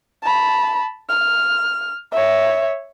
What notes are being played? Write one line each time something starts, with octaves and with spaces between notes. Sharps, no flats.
A5 B5
F6
C#5 E5